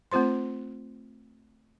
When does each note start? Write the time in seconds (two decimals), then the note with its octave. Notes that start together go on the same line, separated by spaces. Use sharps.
0.12 A3 C4 F4 C5 C6